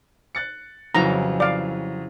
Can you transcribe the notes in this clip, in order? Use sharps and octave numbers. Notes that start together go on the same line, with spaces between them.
F#6 A6 C#7
F2 C#3 E3 F#3 G3 A#5
D5 F5